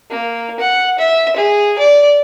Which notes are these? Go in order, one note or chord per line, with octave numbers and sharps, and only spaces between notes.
A#3
F#5
E5
G#4
D5